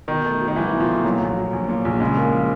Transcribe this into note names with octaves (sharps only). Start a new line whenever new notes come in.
B2 D#3
A3
F#3
D#3
C2 E3
B2
F3
A3
A#2 F#3
A#1
F#3
A#1
A#2
A#1
C#3 G#3
A#3
F3